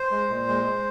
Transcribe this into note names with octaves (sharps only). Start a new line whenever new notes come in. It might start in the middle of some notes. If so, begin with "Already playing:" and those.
Already playing: C5
G#3
A#2
G#3
G#3